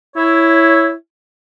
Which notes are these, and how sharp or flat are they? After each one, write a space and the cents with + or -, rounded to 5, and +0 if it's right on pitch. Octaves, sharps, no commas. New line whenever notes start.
E4 +0 C#5 +0